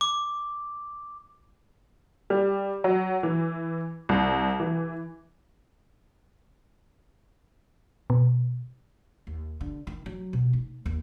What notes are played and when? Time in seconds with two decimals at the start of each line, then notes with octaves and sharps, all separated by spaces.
0.01 D6
2.30 G3
2.84 F#3
3.23 E3
4.09 C2
4.60 E3
8.10 B2
9.27 D#2
9.61 D3
9.87 D#3
10.06 F#3
10.33 B2
10.53 D#4
10.86 D#2